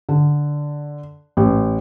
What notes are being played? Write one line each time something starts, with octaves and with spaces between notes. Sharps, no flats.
D3
A1